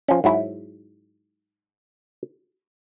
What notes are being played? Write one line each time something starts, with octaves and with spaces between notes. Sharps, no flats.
F3 C#4
G#2 F#3 E4